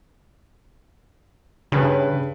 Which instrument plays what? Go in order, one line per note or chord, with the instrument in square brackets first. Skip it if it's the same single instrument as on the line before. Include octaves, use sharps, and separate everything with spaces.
[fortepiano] G2 B4 [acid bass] C#3